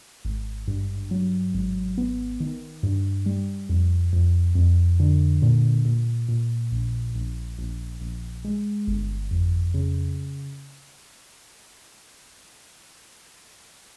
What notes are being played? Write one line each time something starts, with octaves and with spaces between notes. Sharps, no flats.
G#1
G2
F#3
G#1
B3
D#3
G2
G3
F2
F2
F2
D3
A#2
A#2
A#2
A#1
A#1
A#1
A#1
G#3
G1
F2
C#3